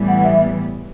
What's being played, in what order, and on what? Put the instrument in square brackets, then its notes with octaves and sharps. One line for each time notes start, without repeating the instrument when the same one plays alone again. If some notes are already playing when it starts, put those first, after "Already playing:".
Already playing: [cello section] A2 E3 G3 B3
[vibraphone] F#5
E5